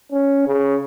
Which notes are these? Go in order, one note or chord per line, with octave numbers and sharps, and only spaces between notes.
C#4
C#3